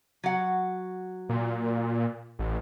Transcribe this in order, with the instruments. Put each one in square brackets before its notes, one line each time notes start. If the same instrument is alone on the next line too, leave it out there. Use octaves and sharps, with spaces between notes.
[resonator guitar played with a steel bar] F#3 F#5
[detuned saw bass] A#2
A1